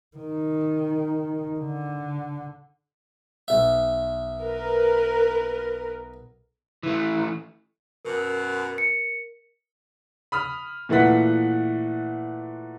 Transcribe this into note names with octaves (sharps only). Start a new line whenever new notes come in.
D#3
D3
B1 E5
A#4 B4
E3 A3
F#2 B2 A#4
C#7
B5 D#6 F6
A#2 E3 A3 B4 F#5 B6